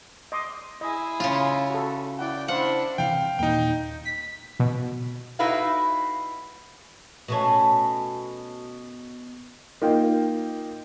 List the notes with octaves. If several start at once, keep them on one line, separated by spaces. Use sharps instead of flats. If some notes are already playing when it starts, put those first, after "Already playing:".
D#5 C6 D6
E4 G#4 D#5
C#3 F4
F#4 A4
E4 D5 F#5 G5
D4 E4 C5 F5 F#5
C3 E3 F5 G5
D#2 A#2 A#3 D#4 G5
B6
B2
D#4 E4 F#4 B4 F5
B2 A3 C#4
A#3 D#4 F4 G5